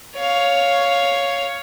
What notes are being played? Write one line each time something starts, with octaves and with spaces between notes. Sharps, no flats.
C#5 F5